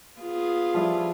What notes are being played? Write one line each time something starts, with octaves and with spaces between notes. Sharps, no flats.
B3 F4 G#4
F3 G3 E4